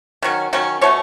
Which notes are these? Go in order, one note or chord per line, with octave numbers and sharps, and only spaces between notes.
D#3 F#3 C#4
D#3 F#3 C#4
B2 A3 C#4 C#5